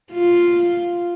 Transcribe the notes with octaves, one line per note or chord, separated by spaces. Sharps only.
F4